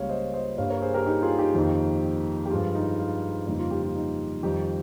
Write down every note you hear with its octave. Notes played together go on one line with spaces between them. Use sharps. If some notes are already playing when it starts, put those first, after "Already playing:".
Already playing: C#2 C#3 G3 A#3 C#5 F5
C5 D#5
C5 D#5
G2 G3 A#3 C#5 F5
A#4 C#5
G#4 C5
G4 A#4
D#4 G4
F4 G#4
D#4 G4
F2 D#3 A#3
G4
G2 F3 G#3 F4
D#4
F4
F2 C#3 G3 A#3 D#4
F4
D#4 G4
F4
D#4
F2 D#3 G3 D#4 G4